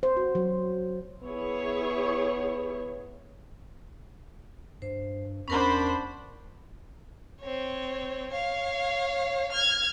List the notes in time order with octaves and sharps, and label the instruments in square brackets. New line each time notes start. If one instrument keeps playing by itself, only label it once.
[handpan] C5
F#4
F#3
[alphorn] B3 [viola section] E4 G#4 C#5
[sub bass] G2 [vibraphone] C5
[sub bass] E2 [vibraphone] C#4 A#4 F#5 [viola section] D4 C5 B5
[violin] C4 C#5
C#5 F5
F6 G#6